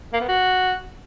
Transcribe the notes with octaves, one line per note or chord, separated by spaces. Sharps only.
A#3
B3
F#4